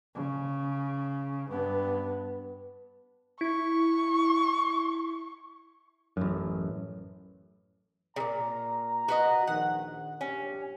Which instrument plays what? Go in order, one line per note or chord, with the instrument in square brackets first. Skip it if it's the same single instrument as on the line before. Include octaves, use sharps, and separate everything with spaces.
[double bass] C#3
G2 B3
[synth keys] E4 [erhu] C#6
[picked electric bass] A1 F#2
[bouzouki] A#2 C#3 [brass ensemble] A#5
[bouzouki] F#4 B4 D#5
[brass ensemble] A#1 D#3 [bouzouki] F#5
[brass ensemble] A#1 G2 G4 [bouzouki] C#4